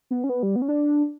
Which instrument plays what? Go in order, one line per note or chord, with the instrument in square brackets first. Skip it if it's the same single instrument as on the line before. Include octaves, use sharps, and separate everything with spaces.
[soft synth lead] B3
C#4
B3
G3
B3
C#4
D4